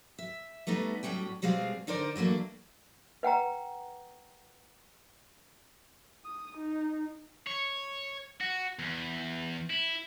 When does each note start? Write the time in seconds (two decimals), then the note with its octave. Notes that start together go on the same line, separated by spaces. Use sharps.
0.19 E5
0.67 G3 A3 B3 D#4
1.03 A2 F#3 G3 C#4 G5
1.42 B2 G3 G#3 C4 G#4 F5
1.87 D3 D#4 A#4 C5 D5
2.15 E3 F#3 A3 A#3 D4
3.23 B4 F#5 G5 A#5
6.25 D#6
6.58 D#4
7.47 C#5
8.41 F#4
8.79 E2
9.70 E4